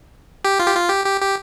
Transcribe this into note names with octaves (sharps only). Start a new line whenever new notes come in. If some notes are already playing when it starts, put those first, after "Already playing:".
G4
F4
G4
F4
G4
G4
G4